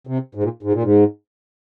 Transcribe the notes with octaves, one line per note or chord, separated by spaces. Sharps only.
C3
G#2
A#2
G#2
A#2
G#2